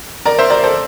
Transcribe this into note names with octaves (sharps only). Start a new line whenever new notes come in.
A#4 D5
C5 E5
A#4 D5
A4 C5